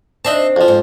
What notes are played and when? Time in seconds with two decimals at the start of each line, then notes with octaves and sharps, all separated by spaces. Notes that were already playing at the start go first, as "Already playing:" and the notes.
0.25 C4 D4 D#4 D#5 E5 A5
0.56 F2 F3
0.68 G#2